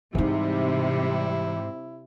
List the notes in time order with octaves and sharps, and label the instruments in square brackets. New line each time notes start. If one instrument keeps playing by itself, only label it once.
[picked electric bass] G#2 [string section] C3 G3 [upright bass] E3 D#4 [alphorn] E4